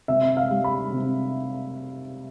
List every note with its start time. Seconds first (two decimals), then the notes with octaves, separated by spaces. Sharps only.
0.08 C3 E5
0.37 F5
0.50 G3
0.64 B5
0.92 C3